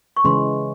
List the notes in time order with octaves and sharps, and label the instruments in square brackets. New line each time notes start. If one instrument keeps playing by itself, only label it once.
[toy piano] C#6
[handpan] C#3 E3 G#3 C#4 [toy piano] C6